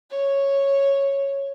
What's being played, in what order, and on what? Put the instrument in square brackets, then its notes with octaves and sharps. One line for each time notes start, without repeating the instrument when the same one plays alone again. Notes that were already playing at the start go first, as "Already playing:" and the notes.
[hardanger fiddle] C#5